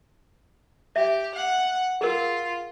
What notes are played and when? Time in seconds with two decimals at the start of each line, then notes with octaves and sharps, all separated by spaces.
0.96 G4 E5
1.35 F#5
2.01 F4 G#4 A#4